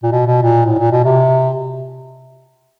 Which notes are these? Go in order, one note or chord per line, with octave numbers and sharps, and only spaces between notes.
A#2
B2
B2
A#2
A2
A#2
B2
C3